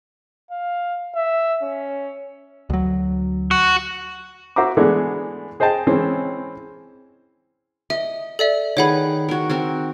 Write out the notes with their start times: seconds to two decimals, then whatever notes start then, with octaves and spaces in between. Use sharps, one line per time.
0.51 F5
1.15 E5
1.62 C#4
2.70 D2 F#3
3.51 F#4
4.56 F#4 C5 E5 A#5 D6
4.77 E3 G#3 A3 B3 D4
5.60 G#4 C5 D#5 G5 A5
5.87 E3 G#3 C4 C#4
7.90 D#5 E5
8.39 A4 D5 E5
8.77 D#3 G#4 B4 C#5 F#5 B5
9.29 F#4 A#4
9.49 C4 F#4 A#4